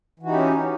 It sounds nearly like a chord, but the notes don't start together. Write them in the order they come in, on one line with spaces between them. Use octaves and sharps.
E3 F#4 D#4 G4 C#4